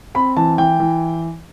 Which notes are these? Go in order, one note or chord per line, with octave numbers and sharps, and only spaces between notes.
C4 B5
E3 A5
E3 G5
E3